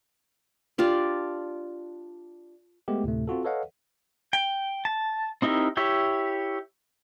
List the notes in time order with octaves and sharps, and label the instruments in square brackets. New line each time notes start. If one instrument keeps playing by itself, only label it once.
[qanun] D4 F4 G4 D5
[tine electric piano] G#3 A3 B3 G4
D2 A2 C3 A3
C4 F4 F#4 A4
A4 B4 C#5 D#5 F5 F#5
[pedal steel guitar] G5
A5
C4 D#4 E4 G4 A#4
E4 G4 C#5 E5